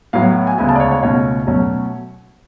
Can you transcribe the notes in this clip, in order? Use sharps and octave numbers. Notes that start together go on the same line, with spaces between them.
A2 F#3 B3 F5
G#5
D2 C#3 G#3 B3 G#5
A5
D5
C#5
C#5
C#2 B2 A3 C#4 C#5
B2 F#3 A3 C#4